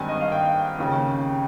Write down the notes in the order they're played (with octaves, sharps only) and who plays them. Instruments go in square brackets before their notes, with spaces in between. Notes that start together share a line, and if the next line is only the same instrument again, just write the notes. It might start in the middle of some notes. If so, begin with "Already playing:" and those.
Already playing: [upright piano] G#1 G2 D#3 G#5
D#5
F5
G5
D#2 C#3